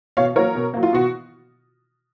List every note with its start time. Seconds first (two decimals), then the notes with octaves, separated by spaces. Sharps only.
0.17 B2 C#5 F5
0.36 F#3 A#3 A#4 C#5
0.55 B2
0.74 F#3 A#3
0.83 F4
0.93 B2 F#4